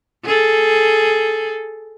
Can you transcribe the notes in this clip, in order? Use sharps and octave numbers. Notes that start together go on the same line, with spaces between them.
G#4 A4